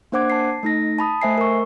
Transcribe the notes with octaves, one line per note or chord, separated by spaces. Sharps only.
A#3 D4 C5 F#5 D6 G#6
A5 C7
A3 D#4 A#6
A5 B5 D#6
A3 C5 E5 G#5 C7
A#4 C#6